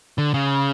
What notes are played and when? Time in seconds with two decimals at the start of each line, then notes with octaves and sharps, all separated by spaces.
0.18 D3
0.34 C#3